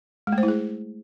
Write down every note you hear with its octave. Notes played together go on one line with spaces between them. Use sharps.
G#3
A3
C5
E4
G#4